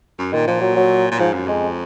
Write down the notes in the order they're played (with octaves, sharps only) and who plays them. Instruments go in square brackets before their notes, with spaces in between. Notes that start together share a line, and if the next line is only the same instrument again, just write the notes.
[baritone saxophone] F#2
[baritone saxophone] A#2 [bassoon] D#3
[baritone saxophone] A#2 [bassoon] F3
[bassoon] F#3
F#3
[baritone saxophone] A#2
[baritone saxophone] G#2 [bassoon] F3
[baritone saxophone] F#2
[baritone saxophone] F2 [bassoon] G#3